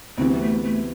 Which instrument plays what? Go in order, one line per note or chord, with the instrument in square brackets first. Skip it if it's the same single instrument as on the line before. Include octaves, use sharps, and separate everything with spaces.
[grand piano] D2 C3 E3 B3 [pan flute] C4
[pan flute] G3
A3
A3